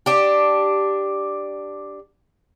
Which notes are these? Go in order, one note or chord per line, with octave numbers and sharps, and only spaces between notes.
D4 G4